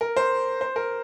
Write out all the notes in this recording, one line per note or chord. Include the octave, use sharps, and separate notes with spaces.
A#4
C5
C5
A#4